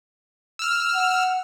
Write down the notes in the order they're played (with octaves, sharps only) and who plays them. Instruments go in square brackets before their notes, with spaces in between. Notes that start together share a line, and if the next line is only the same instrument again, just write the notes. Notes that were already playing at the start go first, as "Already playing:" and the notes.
[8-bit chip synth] E6 F6
[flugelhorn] F#5